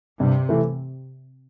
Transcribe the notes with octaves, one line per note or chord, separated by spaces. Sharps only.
G2 C3
E3 A3